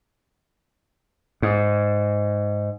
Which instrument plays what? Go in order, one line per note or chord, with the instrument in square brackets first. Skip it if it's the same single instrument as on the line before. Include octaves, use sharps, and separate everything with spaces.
[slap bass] G#2